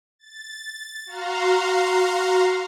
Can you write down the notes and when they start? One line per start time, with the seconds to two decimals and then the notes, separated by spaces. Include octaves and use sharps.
0.19 A6
1.06 F#4 F5 A#5 C6